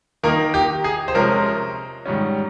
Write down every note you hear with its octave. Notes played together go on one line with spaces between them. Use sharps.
D#3 A#3 D#4 A#4
G4
G#4
C5
C3 F3 G#3 C#4 A#4
G#2 D#3 G3 C#4